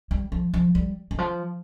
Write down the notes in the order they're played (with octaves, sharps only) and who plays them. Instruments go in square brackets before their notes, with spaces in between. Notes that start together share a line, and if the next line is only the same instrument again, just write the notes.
[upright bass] G3
F3
F3
G3
D#3
F3